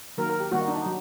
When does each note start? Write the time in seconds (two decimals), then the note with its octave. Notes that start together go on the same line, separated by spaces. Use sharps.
0.17 D#3 F#3 A#3 A#4
0.29 A#4
0.40 G4
0.52 D#3 G3 A#3 F#4
0.60 D#4
0.68 D4
0.77 D#4
0.85 F#3